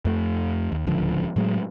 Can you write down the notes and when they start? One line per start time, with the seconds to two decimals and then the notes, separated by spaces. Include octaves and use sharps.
0.05 F2 A3
0.72 D#2
0.87 D1 C#2 D3 F3
1.36 A2 F#3 G#3